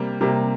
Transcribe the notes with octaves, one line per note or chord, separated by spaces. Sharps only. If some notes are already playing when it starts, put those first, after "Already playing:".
Already playing: C3 G3 A#3
C3 G3 A#3